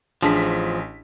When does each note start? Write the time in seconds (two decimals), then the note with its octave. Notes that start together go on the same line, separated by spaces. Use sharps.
0.23 A1 F3 D4 G#4 C5 A5 B6